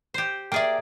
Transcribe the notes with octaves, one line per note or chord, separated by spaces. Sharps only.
G4 C5
A#3 G#4 D5 E5 G5